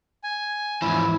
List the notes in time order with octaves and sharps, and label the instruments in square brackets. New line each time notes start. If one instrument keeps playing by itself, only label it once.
[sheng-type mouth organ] G#5
[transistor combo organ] E2 E4 E6 [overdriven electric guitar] G#2 F3 [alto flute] B5